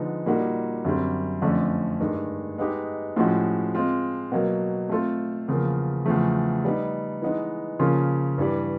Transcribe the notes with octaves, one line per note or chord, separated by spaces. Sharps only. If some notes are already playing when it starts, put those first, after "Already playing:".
Already playing: D3 F3 G#3 B3 D#4
A#2 G3 A#3 D#4 F#4
F#2 D3 G3 C4
F2 D3 F3 A3 C#4
G2 D#3 G#3
G#3 B3 D#4 G4
A2 F3 G#3 C#4 F#4
G#3 C4 F4
B2 F#3 A#3
A3 C4 F4 A4
E2 C#3 F3 A#3
E2 C#3 F3 A3
G3 B3 D#4
E3 G#3 B3 D#4
C#3 F3 A#3 C#4 F4
G2 E3 G3